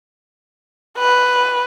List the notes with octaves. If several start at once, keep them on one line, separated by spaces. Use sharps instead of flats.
B4